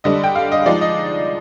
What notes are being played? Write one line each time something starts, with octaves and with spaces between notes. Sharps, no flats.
D3 G3 D4 D#5
G5
F5
D#5
F3 G#3 D#4 D5
D#5